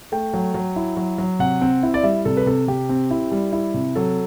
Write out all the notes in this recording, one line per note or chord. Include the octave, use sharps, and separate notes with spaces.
A3 G5
F#3
F#3
E4
F#3
F#3
C3 F#5
C4
E4
D5
G3 E5
C3 A4
B4
C3 A4
C3 G4
C4
E4
G3
E4
C3
F#3 A4